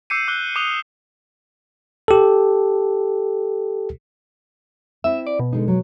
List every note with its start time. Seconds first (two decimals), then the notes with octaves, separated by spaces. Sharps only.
0.10 D6 E6 G6 C7 C#7 D#7
0.28 D6 F#6 G7
0.56 D6 D#6 F#6 D#7 F7 G7
2.08 G4 A4
5.04 C4 E4 E5
5.27 D5
5.39 B2
5.52 D3 G#3 D#4
5.68 F#3